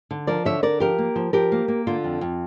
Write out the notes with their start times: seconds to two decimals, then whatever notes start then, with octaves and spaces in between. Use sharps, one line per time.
0.11 D3
0.27 F3 A#4 D5
0.45 D3 C#5 E5
0.63 D3 A#4 D5
0.80 F3 G4 A#4
0.98 A#3
1.16 F3
1.33 F3 G4 A#4
1.52 A#3
1.68 A#3
1.87 D3 F4
2.04 F2
2.21 F2